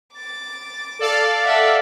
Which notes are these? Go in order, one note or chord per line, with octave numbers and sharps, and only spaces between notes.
D6 A6
A4 D5 F5
E5 F#5